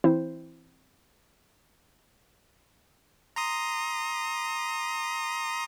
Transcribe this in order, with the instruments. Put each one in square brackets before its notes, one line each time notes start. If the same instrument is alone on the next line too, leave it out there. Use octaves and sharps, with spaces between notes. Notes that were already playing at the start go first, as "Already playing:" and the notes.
[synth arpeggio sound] E3 C4 E4 C5
[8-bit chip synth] A#5 C6 D#6